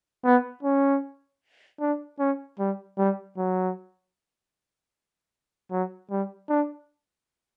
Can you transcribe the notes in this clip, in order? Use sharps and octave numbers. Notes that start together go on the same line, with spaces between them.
B3
C#4
D4
C#4
G3
G3
F#3
F#3
G3
D4